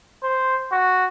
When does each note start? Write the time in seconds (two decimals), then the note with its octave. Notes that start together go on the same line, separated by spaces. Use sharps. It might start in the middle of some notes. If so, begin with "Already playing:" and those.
0.23 C5
0.72 F#4